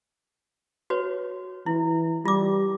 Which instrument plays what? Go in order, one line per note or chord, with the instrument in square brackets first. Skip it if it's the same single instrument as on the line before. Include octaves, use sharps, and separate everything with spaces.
[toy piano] F#4 B4 C#5
[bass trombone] E3 [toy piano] E4
[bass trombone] G3 [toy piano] F4 D6